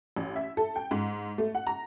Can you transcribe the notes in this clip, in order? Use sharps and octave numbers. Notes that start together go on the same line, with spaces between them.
A1
E5
A4
G5
G#2
A3
F#5
A#5